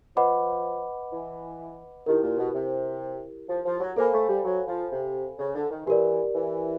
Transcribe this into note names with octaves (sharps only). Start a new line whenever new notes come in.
F3 B4 D#5 F#5 B5 D6
E3
D#3 E4 G4 A#4
A#2
B2
C3
F3
F3
F#3
A#3 A4 C5 F5 G#5 B5
A3
G3
F#3
F3
C3
C#3
D3
D#3
E3 G4 A#4 D5
E3